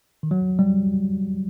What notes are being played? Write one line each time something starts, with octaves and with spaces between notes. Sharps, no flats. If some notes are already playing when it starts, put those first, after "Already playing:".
D#3
F#3
G3